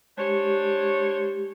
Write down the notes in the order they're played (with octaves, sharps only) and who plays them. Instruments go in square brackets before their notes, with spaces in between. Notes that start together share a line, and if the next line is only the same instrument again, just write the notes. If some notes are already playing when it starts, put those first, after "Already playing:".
[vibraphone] G#3 G4 [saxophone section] D4 C5 C#5